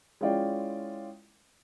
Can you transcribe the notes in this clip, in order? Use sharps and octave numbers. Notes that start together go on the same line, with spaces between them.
G#3 C#4 E4 F4 D5 G5